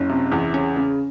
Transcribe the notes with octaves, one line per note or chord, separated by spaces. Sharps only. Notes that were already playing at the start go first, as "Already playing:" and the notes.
Already playing: F#1 C#4
C3
E2
C#3 C#4
C#3